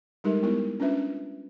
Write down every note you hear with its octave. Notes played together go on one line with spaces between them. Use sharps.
G3 G#3 D#4 G4 A4 A#4
B3 E4 A#4
C#4 D4 F4 B4 E5